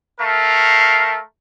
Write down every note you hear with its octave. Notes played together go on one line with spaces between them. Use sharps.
A3 A#4 F5